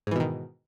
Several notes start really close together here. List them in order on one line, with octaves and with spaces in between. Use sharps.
G#2 E3 B2 D#3